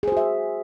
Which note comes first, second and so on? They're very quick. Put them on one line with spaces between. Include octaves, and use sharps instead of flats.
G#4 C5 F#4 E5